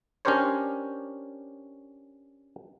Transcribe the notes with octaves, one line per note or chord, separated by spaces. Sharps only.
C#4 D4 G4 A#4 C5 C#5